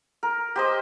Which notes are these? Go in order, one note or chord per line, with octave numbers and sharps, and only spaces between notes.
A#4
G4 C5 D#5